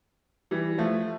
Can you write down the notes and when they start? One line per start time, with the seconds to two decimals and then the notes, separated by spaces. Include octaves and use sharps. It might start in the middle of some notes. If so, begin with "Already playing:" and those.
0.51 E3 G3
0.78 F3 A3